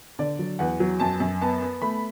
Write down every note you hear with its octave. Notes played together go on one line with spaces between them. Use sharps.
D3 D5
F#3
E2 F#5
F#3
F#2 A5
F#2
B3 A5
B3
A3 B5